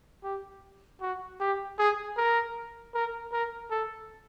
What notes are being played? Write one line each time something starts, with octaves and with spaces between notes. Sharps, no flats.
G4
F#4
G4
G#4
A#4
A#4
A#4
A4